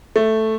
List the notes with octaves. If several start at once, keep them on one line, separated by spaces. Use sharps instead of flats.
A3